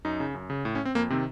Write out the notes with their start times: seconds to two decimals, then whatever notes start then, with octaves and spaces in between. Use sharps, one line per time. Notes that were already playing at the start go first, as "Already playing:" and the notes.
0.05 F#2 D#4
0.20 C#3
0.34 F#2
0.50 C#3
0.65 A2
0.75 C#4
0.85 C4
0.95 F2 A#3
1.10 C3 D#3 C4